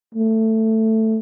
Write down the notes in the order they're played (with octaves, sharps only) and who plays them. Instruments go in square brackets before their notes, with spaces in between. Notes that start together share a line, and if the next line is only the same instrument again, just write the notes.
[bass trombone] A3